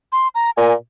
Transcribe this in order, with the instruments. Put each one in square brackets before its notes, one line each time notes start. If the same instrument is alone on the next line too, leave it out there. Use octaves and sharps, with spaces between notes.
[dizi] C6
A#5
[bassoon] A#2 [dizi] G#5